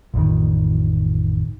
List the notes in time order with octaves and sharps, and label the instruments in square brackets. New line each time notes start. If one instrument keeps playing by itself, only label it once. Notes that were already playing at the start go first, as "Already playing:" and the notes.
[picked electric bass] A1 F2 D#3